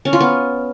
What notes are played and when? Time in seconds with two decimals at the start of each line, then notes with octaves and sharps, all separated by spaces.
0.05 C#4
0.13 F4
0.20 B3